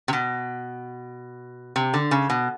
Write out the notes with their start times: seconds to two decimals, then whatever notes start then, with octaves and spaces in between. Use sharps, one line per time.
0.08 C3
0.13 B2
1.76 C3
1.94 D3
2.11 C#3
2.30 B2